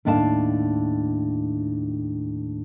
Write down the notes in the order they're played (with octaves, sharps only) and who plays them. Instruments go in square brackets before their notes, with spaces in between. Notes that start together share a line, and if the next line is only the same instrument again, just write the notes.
[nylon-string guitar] D#2 A2 D4 F5 F#5 A5